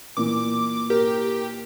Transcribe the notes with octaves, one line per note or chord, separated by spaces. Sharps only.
A#2 E3 D6
G4 A#4